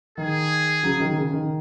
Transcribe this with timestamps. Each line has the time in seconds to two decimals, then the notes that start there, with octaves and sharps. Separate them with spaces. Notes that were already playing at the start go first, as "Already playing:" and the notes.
0.18 D#3 G#4
0.83 C#3 F#3
1.00 D#3
1.16 C#3
1.33 D#3